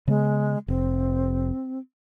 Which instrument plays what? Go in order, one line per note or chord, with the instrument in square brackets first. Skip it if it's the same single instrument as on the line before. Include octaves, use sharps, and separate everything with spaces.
[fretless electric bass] C#3 B3 [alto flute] G#3
[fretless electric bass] F1 [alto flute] C4